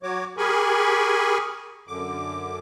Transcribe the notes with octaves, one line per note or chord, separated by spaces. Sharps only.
F#3 F#4 C#5 D6
G4 G#4 A#4 G#5 B5 C#6
F#2 D3 D6